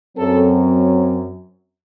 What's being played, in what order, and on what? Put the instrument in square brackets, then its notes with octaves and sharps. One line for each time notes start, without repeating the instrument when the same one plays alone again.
[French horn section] F#2 F#3 C4 A4